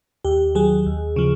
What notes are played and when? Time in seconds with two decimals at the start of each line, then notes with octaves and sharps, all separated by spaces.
0.25 D#2 G4
0.55 D#3 F#3 G#4
0.87 D#2
1.16 C#3 F3